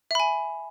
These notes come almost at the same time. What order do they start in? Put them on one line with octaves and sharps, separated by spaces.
E5 B5 G#5